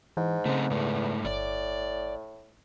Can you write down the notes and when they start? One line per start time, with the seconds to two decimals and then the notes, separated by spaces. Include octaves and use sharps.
0.17 G#2 E3
0.46 C#3 A3 C4
0.70 E2 G#2 A3
1.25 G1 A2 D5